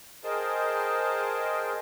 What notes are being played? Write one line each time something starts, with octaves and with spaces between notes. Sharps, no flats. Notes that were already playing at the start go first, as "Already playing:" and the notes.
G#4 A#4 C5 D#5 G5 A5